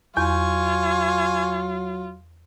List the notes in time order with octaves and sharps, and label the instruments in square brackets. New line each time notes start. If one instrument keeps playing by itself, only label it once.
[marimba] E2 [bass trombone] F#3 [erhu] F4 [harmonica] G#5 C#6